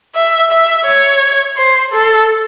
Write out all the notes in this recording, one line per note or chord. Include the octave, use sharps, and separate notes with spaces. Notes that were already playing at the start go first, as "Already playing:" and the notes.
E5
E5
C#5
C5
A4